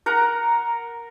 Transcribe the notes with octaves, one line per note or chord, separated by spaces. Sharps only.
A#4 F#5 A#5